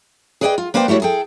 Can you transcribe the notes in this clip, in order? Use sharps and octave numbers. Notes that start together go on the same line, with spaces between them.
G#4 B4 D5 D#5 F5 G5
F4
A#3 B4 C5 D5 G5
G3 A3 E4 F#4 C#5
G#4 A4 G5